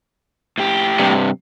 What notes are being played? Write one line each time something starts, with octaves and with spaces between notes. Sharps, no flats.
A2 G4
G2 C3